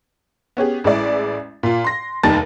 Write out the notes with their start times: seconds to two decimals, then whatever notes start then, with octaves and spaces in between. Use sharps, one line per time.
0.57 B3 C#4 G4 G#4
0.84 A1 G#3 E4 D5
1.63 A#2 F4
1.84 C6 A#6
2.23 F1 D#2 G3 D#4 A5 A6